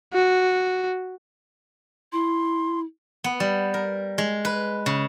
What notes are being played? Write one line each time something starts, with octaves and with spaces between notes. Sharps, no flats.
F#4
E4 C6
B3
G3
A#4
G#3
B4
C#3